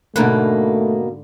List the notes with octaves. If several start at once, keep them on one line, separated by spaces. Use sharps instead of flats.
G#2 B2 D3 A3 A#3 B4